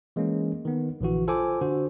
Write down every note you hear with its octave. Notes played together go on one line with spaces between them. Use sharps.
E3 G#3 A#3 C#4
D#3 B3
A#1 D3 E3 F#4
F4 A4 C5 G#5 D6
D3 F#4 C5